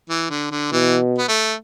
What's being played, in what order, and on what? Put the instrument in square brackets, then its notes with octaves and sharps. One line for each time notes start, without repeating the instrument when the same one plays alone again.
[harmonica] E3
D3
D3
[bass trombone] B2 [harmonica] E3
[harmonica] B3
A3